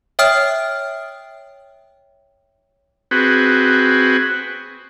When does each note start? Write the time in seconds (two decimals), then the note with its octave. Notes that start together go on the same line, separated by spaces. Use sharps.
0.19 C#5 E5 G5 D#6 F6 D7
3.11 C4 F#4 G#4 B4